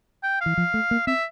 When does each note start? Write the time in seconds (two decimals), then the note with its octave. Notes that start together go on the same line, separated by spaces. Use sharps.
0.24 G5
0.41 E3 F5
0.57 F3
0.74 A3
0.91 A#3
1.07 C4 E5